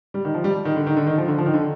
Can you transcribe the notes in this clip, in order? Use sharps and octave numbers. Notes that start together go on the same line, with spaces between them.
G3
D#3
F3
G3
D#3
D3
D#3
D3
D#3
F3
D3
F3
D#3
D3